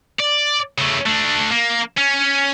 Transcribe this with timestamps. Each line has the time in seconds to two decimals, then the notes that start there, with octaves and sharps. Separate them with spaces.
0.20 D5
0.78 C#3 A3
1.06 A3 D4
1.52 A#3
1.97 C#4